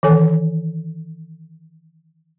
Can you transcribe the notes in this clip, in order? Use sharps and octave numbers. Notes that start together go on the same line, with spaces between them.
D#3 E3 A4 G#5